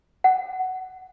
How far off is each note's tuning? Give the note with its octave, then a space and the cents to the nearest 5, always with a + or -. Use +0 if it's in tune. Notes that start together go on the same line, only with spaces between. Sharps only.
F#5 +10